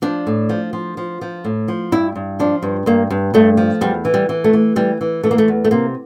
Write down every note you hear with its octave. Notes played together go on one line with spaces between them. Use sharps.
F3 D4
A2
F3
F3
F3
F3
A2
F3
G2 E4
G2
F3 D4
G2
G2 A#3
G2
G2 A3
F3
E2 G3
E3
G3
E3
A3
E3
E3 G3
E3
E3 A3
A#3
A3
E2
A3
C3 A#3